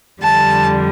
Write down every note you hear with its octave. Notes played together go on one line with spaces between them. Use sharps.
F2 D3 G3 A5